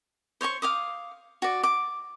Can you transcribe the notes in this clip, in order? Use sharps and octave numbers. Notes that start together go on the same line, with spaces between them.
C5 C#5 D#5 C#6
F5 D6 D#6
F#4 D5
D6